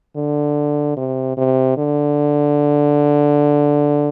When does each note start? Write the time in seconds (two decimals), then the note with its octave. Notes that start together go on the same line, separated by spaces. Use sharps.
0.17 D3
0.97 C3
1.37 C3
1.78 D3